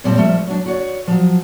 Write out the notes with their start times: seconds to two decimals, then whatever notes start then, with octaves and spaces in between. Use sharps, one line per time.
0.04 F#2 A#2 G3 C4 D5 A5
0.17 F3 G3 A3 A#4 E5
0.47 F#3 D4
0.66 F#4 C#5 D5
1.07 F3 F#3